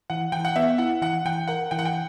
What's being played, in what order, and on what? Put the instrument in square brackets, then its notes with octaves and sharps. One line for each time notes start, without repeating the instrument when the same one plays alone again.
[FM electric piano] E3 [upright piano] F#5
[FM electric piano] E3 [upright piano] G5
[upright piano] F#5
[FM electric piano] B3 [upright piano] E5
[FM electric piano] E4 [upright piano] F#5
[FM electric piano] E3 [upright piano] F#5
[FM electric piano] E3 [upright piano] G5
[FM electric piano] A#4 [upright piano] F#5
[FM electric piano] E3 [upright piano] G5
[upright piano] F#5
G5